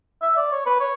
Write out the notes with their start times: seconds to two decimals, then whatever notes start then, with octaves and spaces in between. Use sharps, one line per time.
0.22 E5
0.37 D5
0.52 C#5
0.66 B4
0.80 C#5